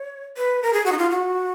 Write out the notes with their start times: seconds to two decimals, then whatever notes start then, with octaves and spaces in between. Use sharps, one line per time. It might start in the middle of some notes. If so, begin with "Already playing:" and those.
Already playing: C#5
0.37 B4
0.63 A#4
0.73 G#4
0.86 F#4
0.92 D#4
0.98 F4
1.11 F#4